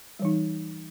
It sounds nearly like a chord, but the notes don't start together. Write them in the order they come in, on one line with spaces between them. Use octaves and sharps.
G3 E3 D#4